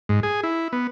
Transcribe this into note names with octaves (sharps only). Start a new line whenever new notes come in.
G#2
G#4
E4
B3